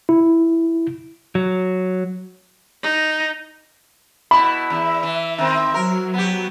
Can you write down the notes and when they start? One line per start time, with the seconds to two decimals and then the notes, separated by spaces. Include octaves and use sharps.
0.09 E4
1.35 F#3
2.82 D#4
4.31 B2 E4 B5
4.70 E2 E4 E5
5.03 E3
5.38 D#3 C4
5.74 F#3 A#4
6.14 B3 G4